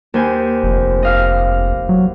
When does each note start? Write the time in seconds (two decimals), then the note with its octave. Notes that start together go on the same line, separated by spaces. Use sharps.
0.14 D#2 C5 G#5
0.63 F1
1.03 D#5 F5 F6
1.89 F#3